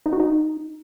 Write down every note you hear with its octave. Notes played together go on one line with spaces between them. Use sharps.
D#4
F#4
D#4